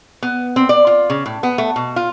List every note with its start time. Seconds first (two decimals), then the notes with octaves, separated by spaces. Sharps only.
0.22 B3
0.56 C4
0.69 D5
0.87 F4
1.10 C#3
1.26 A2
1.43 B3
1.58 A3
1.76 B2
1.96 F4